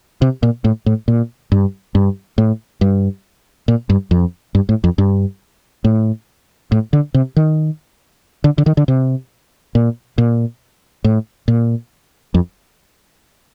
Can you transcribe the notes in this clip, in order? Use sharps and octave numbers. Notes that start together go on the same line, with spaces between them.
C3
A#2
A2
A2
A#2
G2
G2
A2
G2
A#2
G2
F2
G2
A2
F2
G2
A2
A2
D3
C3
D#3
D3
D3
D#3
D3
C3
A#2
A#2
A2
A#2
F2